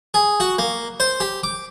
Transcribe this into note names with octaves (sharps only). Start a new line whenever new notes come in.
G#4
F#4
A#3
C5
G4
D6